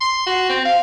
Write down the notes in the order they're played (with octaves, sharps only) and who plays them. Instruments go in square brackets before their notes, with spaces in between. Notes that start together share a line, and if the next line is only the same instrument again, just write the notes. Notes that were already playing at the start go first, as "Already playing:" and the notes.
[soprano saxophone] C6
F#4
C4
F5